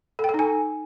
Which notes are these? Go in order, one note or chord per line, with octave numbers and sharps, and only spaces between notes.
A4
G5
A4
D#4
G#5